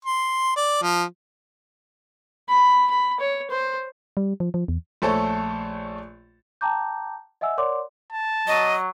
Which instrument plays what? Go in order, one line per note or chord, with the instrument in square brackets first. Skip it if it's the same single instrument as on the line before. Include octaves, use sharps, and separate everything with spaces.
[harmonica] C6
D5
F3
[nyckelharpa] B5
B5
C#5
C5
[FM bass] G3
F3
F3
E2
[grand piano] A#1 A3 A4 C5 C#5
[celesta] G5 A5 A#5 D6 G6
D#5 E5 F#5 G#5 E6
A#4 C#5 D5 F#5 C6 D6
[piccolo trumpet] A5
[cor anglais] F#3 [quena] D#5